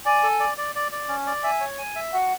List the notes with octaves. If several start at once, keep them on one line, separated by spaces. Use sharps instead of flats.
D5 G#5
A4
D5
D5
D5
D5
C#4
D5
E5 G#5
C#5
G#5
E5
F#4 F#5